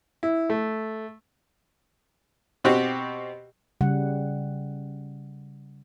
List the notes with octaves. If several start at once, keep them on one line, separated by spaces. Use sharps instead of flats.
E4
A3
B2 C4 F#4 G4
C#3 G3 F#5